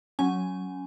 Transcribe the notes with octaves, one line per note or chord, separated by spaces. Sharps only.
F#3 C#4 G#5